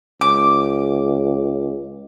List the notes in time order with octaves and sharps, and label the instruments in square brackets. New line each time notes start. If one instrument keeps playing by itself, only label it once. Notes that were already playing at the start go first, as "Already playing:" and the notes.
[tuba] C#2 [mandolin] D6